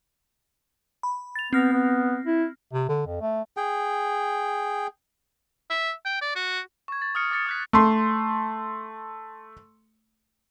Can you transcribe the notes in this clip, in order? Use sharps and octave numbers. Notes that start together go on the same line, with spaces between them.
B5
A6 F7
B3 C4 F6 A#6
B3
E4
C3
D3
F2
A3
G#4 G5
E5
G5
D5
F#4
C#6 G#6
A6
D#6 F6 C#7
D6 A6 C#7
D#6 F#6 B6
A3 C6